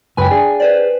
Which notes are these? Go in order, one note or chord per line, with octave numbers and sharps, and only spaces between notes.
C#2 F#2 B4 G5 G#5
D4 G#4
B4 C5 D5